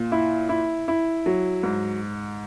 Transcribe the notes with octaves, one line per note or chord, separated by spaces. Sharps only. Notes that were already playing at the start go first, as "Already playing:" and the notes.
Already playing: A#2
E4
E4
E4
F#3
G#2